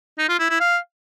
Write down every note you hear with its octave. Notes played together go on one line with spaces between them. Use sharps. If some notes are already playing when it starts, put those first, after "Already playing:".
D#4
F4
E4
E4
F5